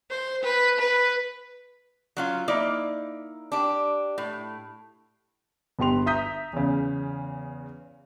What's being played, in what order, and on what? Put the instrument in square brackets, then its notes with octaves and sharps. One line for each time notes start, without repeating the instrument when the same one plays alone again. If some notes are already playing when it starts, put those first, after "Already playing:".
[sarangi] C5
B4
B4
[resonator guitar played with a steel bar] F#3 C#4 F4
A#3 D#4 E4 D5
D4 G4
A2
[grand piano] G1 B3 G4 C6 F7
E5 A#5 D#6 G6 B6
E2 C#3